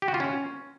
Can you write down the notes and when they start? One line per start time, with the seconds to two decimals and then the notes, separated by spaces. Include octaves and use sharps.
0.02 G4
0.08 F#4
0.14 F4
0.20 C#4